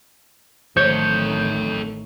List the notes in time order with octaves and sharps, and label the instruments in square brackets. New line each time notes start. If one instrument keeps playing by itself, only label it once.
[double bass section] A1 D#3 A3 [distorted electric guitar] A4 D#5 [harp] C#5 [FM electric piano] G6